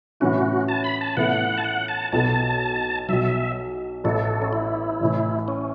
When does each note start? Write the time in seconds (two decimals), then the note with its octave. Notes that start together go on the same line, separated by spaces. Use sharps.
0.20 A2 E3 C#4 E4 F#4
0.68 A5
0.84 B5
1.01 A5
1.17 A2 E3 B3 A4 E5 F#5
1.58 A5
1.64 F#5
1.88 A5
2.12 B1 B2 B3 A4 A5
3.08 B1 B2 F#3 E5
4.04 A1 A2 A3 A4
4.42 C#4
4.53 E4
5.00 A1 A2 E3
5.48 C#4